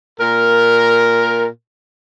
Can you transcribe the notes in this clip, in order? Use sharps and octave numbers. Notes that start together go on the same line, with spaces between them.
A#2 A#4